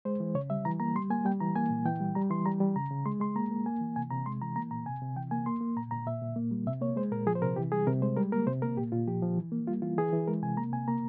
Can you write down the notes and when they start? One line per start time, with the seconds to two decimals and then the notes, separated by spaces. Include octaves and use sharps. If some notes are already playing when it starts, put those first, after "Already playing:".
0.05 G#3 C5
0.20 E3
0.35 C#3 C#5
0.50 G3 E5
0.65 E3 A#5
0.80 A#3 A#5
0.95 G3 C6
1.10 A#3 G#5
1.25 G3 G5
1.40 E3 A#5
1.56 A#3 G#5
1.70 A#2
1.85 E3 G5
2.00 G3
2.15 G3 A#5
2.30 E3 C6
2.46 G3 A#5
2.60 G3
2.76 C#3 A#5
2.91 C#3
3.06 G#3 C6
3.20 G#3 C6
3.36 A#3 A#5
3.51 A#3
3.66 A#3 G#5
3.81 E3
3.96 C3 G#5
4.10 C3 A#5
4.26 G#3 C6
4.41 E3 A#5
4.56 A#3 A#5
4.71 A#2 A#5
4.86 C3 G#5
5.01 C3
5.16 E3 G5
5.31 A#3 G#5
5.46 A#3 C6
5.61 A#3
5.77 A#2 A#5
5.91 A#2 A#5
6.07 A#2 E5
6.22 A#2
6.36 A#3
6.51 G3
6.66 C3 E5
6.81 A#3 C#5
6.96 G#3 C5
7.12 A#2 A#4
7.27 F3 G#4
7.35 C5
7.42 C3 A#4
7.56 E3 G4
7.72 G3 G#4
7.87 C3 A#4
8.02 G#3 C5
8.17 G3 A#4
8.32 A#3 A#4
8.47 C3 C5
8.62 A#3 A#4
8.77 A#2 G4
8.92 A#2 F4
9.07 F3 G4
9.22 F3
9.38 E3
9.52 A#3
9.67 G3 F4
9.82 E3 F4
9.97 E3 G#4
10.13 E3
10.27 G#3 A#4
10.42 C3 G#5
10.57 A#3 A#5
10.72 C3 G#5
10.88 A#3 A#5